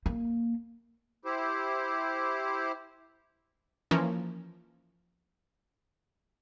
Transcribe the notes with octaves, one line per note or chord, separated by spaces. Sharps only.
A#3
E4 G4 C5
E3 F3 A#3 C#4